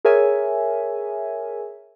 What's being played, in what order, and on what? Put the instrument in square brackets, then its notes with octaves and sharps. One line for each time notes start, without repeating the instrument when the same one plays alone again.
[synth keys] G#4 A#4 C#5 E5 G#5